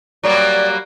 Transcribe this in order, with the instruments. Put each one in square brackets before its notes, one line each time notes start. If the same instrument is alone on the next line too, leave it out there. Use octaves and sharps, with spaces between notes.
[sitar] F#3 G3 A#3 [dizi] D5